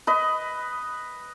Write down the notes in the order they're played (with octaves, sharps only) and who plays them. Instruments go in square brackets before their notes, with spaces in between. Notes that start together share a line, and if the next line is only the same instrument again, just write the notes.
[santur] B4 D#5